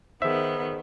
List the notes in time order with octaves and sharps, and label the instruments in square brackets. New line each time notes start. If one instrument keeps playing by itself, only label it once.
[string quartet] D#3 B3 [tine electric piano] G#4 C5 [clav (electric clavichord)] E5